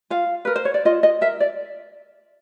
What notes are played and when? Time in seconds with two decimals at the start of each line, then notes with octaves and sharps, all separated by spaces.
0.10 F4 F5
0.45 A#4 B4
0.56 C5
0.65 C#5
0.74 D5
0.85 F4 D#5
1.03 D#5
1.21 A#4 E5
1.40 D5